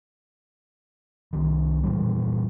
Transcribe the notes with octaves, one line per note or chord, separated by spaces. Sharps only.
C2 D#3
A#2 E3 G3